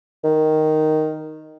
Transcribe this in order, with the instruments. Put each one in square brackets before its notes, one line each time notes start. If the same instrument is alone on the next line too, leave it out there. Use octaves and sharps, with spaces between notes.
[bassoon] D#3